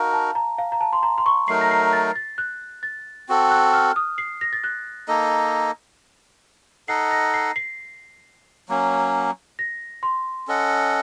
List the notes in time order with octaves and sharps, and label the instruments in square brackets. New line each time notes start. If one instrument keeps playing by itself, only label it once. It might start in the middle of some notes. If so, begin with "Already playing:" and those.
Already playing: [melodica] D#4 F#4 A#4 [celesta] F5 A5
[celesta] A5
A#5
F5
A#5
A5
C6
A#5
C6
C#6
[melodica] F#3 A3 D#4 A#4 [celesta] C7
[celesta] A#6
C7
A6
A6
F#6
A6
[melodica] C4 F#4 A4
[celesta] F#6
F6
D#6
C7
A#6
A6
F#6
[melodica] A#3 D#4 A4 D#5
[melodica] D#4 A4 D#5 F#5 [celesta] C7
[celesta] A#6
C7
C7
[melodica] F#3 A#3 C#4
[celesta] A#6
C6
[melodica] C#4 A4 D#5 F#5